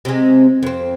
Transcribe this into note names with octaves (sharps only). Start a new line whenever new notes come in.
C3 G#3
F2 C4